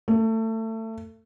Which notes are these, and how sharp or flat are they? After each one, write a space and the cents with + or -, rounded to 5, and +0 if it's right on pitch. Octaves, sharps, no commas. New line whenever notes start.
A3 +25